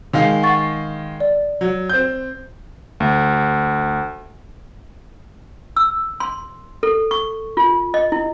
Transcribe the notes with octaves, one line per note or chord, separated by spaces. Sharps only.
D#3 G#3 F5
F#5 C#6 A6
D5
F#3
C4 G6
D2
E6
C6
A4
C#6
F4
D#5
E4